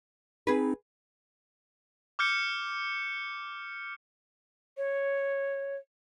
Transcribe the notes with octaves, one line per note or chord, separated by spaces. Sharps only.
C4 D#4 G#4 B4
D6 F6 G6 C#7
C#5